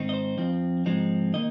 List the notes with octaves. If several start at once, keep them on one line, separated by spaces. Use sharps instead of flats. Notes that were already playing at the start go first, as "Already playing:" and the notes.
Already playing: G#2 D#3 C4 D#4
D#5
C5
F2 F3 C4
G#2 F3 G#3 C4 D#4
D#3 A#3 D#4 D#5